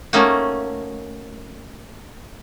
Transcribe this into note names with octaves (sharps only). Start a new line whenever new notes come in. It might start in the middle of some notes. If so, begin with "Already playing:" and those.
A3 A#3 C#4 D#4 F#4